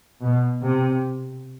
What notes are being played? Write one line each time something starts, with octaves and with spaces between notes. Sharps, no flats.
B2
C3